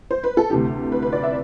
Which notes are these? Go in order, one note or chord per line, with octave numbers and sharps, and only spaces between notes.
C5
B4
A4
D2 C3 E3 G4
B4
B4
D5
E5